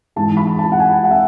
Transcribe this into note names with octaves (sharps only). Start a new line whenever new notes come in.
G#2 E3 G#3 D#4 A5
B5
A5
F#5
G#5
F#5
E5